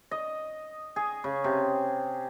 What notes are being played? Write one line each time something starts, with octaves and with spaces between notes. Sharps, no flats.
D#5
G#4
C#3
C3